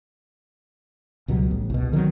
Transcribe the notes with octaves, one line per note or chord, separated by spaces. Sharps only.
C#2 B2 F#3 G3
A1
C2 B2
D3 D#3 F#3 C4